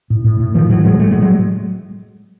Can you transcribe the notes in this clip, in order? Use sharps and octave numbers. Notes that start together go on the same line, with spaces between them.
A2
A2
A2
A2 D#3 F3
A2 E3 F#3
A2 F#3 G#3
A2 G3 A3
F#3 G#3
A2
F#3 G#3